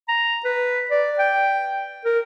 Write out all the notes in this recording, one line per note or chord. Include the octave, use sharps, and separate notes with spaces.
A#5
B4
D5
G5
A#4